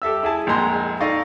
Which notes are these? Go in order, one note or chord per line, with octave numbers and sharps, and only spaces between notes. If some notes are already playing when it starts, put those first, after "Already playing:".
G4 A4 E5 E6
E4 G#4 A5
A#1 F2 G#3 A#5 C6
D#4 A4 D5 D#5 F5 C#6